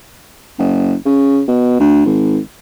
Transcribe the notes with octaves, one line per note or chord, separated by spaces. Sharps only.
F#1
C#3
B2
D2
G#1